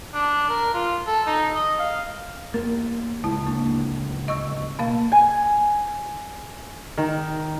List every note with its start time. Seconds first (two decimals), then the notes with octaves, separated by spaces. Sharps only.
0.14 D4
0.49 A#4
0.74 F4
1.07 A4
1.27 D#4
1.55 D#5
1.80 F5
2.54 E2 A#3 A#4
3.24 D1 C#2 G#2 E4 A5
3.47 A#3 D4
4.28 D#5 C#6 E6
4.79 B2 A#3 F5
5.12 G#5
6.97 D#3